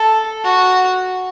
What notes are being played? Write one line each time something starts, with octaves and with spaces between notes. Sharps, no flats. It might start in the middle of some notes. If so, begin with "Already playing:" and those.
Already playing: A4
F#4